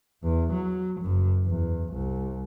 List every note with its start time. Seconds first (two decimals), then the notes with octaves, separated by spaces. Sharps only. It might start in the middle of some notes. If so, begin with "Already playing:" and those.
0.23 E2
0.52 F#3
1.01 F#1 F#2
1.46 E2
1.93 C2